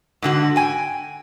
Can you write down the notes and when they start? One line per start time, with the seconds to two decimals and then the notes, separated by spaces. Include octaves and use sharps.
0.22 G#2 D3 F#4
0.56 G5 G#5